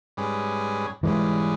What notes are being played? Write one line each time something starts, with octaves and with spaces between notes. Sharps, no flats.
G#2 G3 C#4 G#4 B4
G#2 E3 G3 G#3 C#4 G#4 B4